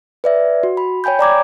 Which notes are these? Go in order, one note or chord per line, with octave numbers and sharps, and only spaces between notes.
B4 D5 E5
F#4
B5
C#5 G5 G#5 B5 G6
D5 A#5 D6 G#6